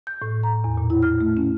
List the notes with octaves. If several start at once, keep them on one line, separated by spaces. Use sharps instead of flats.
G6
A2
A#5
E2
A#2
E4
F6
A3
C#4